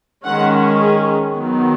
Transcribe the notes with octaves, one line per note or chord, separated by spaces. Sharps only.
D#3 G#3 C#4 F#5
G#4
D#3 F#3 B3